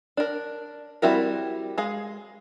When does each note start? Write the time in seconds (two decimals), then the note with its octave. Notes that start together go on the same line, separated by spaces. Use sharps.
0.17 D4 A#4
1.02 G3 C4 E4 F#4 A#4
1.78 G#3 G#4 F5